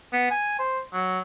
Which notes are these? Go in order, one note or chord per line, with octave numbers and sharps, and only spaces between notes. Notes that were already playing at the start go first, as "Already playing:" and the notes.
B3
G#5
C5
F#3